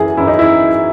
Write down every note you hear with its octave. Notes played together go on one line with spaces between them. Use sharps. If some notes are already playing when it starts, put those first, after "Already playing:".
Already playing: F#2 E3 G#4
F#2 E3 E4
D#4
E4